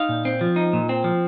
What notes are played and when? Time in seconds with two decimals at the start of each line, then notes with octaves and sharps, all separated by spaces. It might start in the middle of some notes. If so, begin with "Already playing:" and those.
Already playing: D#4 F5
0.09 A#2
0.25 C4
0.41 F3
0.56 D#4
0.73 A#2
0.89 C4
1.04 F3